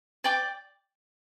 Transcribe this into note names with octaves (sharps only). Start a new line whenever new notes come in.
D5 G5 D6